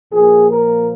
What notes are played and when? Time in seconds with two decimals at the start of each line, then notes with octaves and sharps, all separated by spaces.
0.12 A#2 F3 A#3 G#4
0.50 A#4